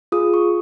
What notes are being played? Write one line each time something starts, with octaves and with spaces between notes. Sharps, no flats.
F4 G#4 D#6
C#6